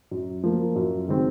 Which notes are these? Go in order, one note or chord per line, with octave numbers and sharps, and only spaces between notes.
F#2
F3 A#3
F#2
D#3 G#3 C4